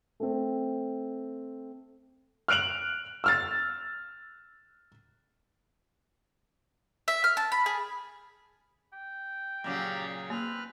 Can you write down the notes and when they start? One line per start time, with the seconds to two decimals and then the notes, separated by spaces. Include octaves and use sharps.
0.20 A3 C4
2.48 F6 F#6 D7 F7 F#7
3.24 E6 F6 A6
7.08 E5
7.24 F6
7.37 A5
7.52 B5
7.66 G#4
8.93 G5
9.64 A#2 C#3 F#3 G4 D5 A#5
10.30 A#3 C4 B4 F6